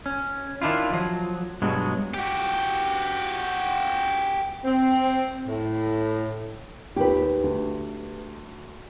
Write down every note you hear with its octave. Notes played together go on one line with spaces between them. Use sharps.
C#4
D#3 D4 E4 F4
F3 F#3
G2 B2 F#3 G#3
F#4 G4
C4
A2
D#2 G4 B4
D2